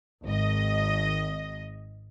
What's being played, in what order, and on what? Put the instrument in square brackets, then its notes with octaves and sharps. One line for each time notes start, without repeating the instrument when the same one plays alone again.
[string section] G#1 D#5